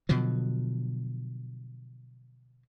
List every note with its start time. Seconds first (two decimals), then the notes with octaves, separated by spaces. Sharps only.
0.09 B2 D3 F3 F#3